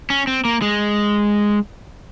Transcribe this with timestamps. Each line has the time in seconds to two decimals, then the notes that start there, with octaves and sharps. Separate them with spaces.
0.10 C#4
0.27 C4
0.45 A#3
0.62 G#3